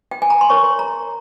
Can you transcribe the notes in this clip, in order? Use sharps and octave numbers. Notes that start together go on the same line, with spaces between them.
G5
G#5
A#5
C6
E4 A#4 C#5 C#6
A#5